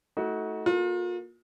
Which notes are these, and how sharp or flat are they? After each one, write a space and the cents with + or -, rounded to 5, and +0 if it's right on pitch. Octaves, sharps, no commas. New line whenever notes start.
A3 +0 D#4 +40 F#4 +0
A#3 +20 F4 +40 A4 +0